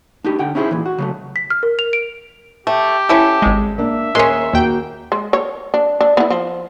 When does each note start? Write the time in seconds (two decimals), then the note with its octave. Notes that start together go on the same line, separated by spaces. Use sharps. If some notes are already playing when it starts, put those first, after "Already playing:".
0.24 D4 D#4 G4
0.39 D3 F#5 G5
0.55 C#4 D#4 E4 F#4 G#4 C5
0.71 A#2 E3
0.86 F#4
0.98 C#3 F#3 A3
1.36 B6
1.50 F6
1.63 A#4
1.79 F7
1.93 D7
2.67 A3 G4 G5
3.09 C#4 E4 A4
3.42 G#1 G#3
3.78 A#3 D4 E5
4.15 D#2 G#3 C#4 A#4 D#5 C6
4.53 D#2 A#3 F#4 G5
5.12 G#3
5.33 C#5
5.74 D4
6.01 D4
6.17 B3 E4
6.30 F3